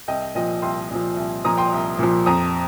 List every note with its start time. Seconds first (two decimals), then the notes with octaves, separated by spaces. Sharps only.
0.08 C2 D#5 G5
0.35 A#2 F3 D#5 G5
0.62 C2 G5 C6
0.91 A#2 F3
1.17 C2
1.45 A#2 F3 A#5 D#6
1.58 G5 C6
1.72 C2
1.99 A#2 F3
2.26 F2 A#5 D#6